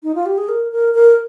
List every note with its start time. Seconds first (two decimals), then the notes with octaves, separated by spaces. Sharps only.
0.03 D#4
0.15 F4
0.26 G4
0.38 G#4
0.49 A#4
0.72 A#4
0.94 A#4